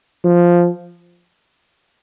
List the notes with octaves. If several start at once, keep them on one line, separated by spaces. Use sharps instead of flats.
F3